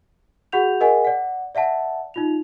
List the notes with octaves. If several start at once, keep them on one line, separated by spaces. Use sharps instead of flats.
F#4 G#4 F#5 G6 F7
G#4 A#4 D#5 F#5 G#5
D5 F#5
D5 E5 F#5 A5
D#4 F4 F7